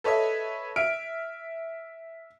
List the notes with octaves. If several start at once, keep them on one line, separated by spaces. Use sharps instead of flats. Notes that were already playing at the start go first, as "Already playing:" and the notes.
A4 B4 C#5 D#5 E5
E5 F6 D7